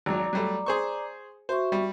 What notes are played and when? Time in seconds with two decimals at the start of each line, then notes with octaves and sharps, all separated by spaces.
0.06 G#1 F#3 D5 A#5 D6
0.33 F#3 G3 A3
0.66 G#4 C5 C#6
1.49 F#4 C5 E5 C#6
1.72 G3